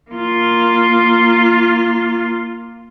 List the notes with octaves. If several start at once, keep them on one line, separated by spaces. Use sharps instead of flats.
A#3 F4